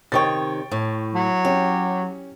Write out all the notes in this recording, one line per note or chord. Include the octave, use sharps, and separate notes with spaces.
C3 D#3 C#5 G5 C#6 A6
A2
F#3
C#4 G4